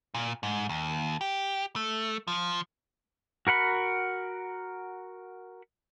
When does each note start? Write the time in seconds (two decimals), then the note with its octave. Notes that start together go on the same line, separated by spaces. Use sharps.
0.14 A#2
0.43 G#2
0.69 D#2
1.21 G4
1.76 A3
2.28 F3
3.47 F#4 A#4 F#5 B5